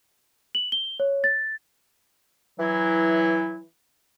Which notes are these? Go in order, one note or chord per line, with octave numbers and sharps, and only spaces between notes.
F#7
G7
C#5
A6
E3 F#3 E4